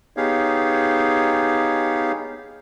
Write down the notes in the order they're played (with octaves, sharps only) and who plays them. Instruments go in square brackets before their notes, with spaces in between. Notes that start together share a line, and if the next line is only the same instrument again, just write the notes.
[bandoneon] B3 D#4 G4 G#4 C#5 F5